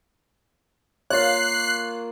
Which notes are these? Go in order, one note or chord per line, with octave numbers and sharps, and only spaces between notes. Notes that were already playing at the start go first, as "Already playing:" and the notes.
A#3 F4 C#5 F#6 C7